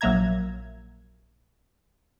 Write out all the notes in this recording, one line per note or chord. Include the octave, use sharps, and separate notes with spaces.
A#1 F#3 A#3 E5 A#5 G#6